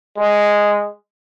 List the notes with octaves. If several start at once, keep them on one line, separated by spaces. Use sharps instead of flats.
G#3